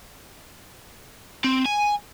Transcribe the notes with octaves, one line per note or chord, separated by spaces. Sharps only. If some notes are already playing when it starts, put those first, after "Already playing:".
C4
G#5